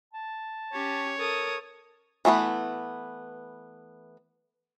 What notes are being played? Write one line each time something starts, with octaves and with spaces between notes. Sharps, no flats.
A5
C#4 G4 C#5
A4 A#4 D#6
E3 A3 B3 B4